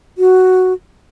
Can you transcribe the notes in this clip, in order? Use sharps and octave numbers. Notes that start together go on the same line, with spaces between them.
F#4